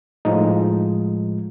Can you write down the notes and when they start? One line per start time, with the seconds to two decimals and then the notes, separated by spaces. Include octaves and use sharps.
0.25 A2 F3 G#3 D#4